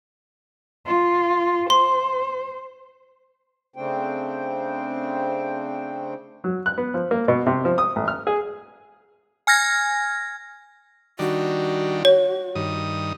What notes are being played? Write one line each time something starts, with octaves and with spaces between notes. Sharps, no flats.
F4
C5 C6
C#3 A3 C4 D4 C5 G5
F#3
F#6
B3
F3
A#3
B2
C3
F3
D#6
A1
F6
G#4
G#5 F6 G#6 A#6
D#3 G3 D4 F#4
C#5
G2 D#3 D#6